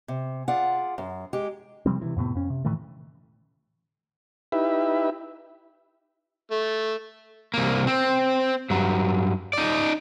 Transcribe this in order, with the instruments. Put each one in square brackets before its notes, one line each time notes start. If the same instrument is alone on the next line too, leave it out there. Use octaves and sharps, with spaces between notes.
[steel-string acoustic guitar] C3
F4 G#4 D5 F#5
F#2
G#3 G4
[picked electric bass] C3 F3 G3 C4
C3 D#3 E3
F2 A2 C3 B3
F2 C#4
C3
A2 D#3 E3 A3
[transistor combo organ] D#4 E4 G4 B4 E5
[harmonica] A3
[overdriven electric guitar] C2 A#3
C4
G2 F#3
D#4 D5